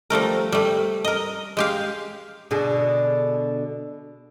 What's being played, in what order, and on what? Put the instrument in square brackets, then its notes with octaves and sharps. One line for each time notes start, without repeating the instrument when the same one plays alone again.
[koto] F3 G3 A3 A#4
G3 A3
A#4 D#5
G#3 G4 F5
[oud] B2 D3 G#4